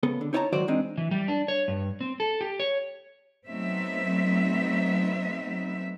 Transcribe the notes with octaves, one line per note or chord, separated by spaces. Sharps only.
C#3 B3 A4
D3
D#4 E4 C#5 D5 A5 A#5
G#2 D#3 F#3 F#4 C5 D5
E3 G#3 C4 D4 D#4
E3
G3
D4
C#5
G2
C4
A4
G4
C#5
F#3 A3 B3 C4 D#4 E5